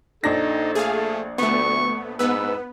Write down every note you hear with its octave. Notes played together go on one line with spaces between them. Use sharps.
A#1 D4 D#4 A4 A#6
A3 G#4 F5
D2 A3 B3 C#6
G#2 B3 B4 E6